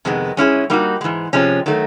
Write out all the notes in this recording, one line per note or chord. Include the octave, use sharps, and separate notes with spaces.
F2 C3 D#3 G#3 B3
G#3 C#4 E4 G#4
G3 A#3 D#4 F#4
G#2 E3 G#3
C3 F3 G#3 C#4
D#3 F#3 A3